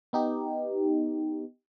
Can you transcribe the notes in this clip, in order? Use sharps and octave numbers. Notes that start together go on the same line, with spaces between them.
B3 D#4 G4